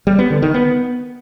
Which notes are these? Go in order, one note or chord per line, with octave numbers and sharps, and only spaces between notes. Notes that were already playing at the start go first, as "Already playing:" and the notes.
G3
B3
D3
D#3
B3